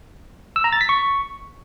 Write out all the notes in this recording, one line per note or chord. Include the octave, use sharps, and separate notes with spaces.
E6
A#5
A6
B6
C#6